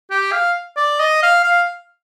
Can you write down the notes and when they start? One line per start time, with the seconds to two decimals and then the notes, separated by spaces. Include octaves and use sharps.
0.11 G4
0.32 F5
0.77 D5
0.99 D#5
1.23 F5
1.44 F5